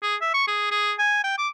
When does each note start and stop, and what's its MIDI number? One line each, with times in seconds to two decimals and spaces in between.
0.03 0.16 68
0.22 0.33 76
0.34 0.44 85
0.48 0.66 68
0.71 0.93 68
0.99 1.19 80
1.24 1.34 79
1.38 1.49 86